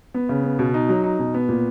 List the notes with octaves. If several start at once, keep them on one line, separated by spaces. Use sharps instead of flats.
B3
C#3
B3
B2
D#4
F#3
D#4
B2
B3
A#2